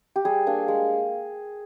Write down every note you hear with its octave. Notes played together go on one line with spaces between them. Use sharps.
G4
G3 G#4
A#3 D4
G#3